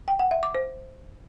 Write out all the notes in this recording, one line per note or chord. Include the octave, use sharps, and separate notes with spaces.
G5
F#5
E5
D6
C5